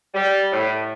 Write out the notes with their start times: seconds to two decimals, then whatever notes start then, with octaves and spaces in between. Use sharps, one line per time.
0.14 G3
0.53 A2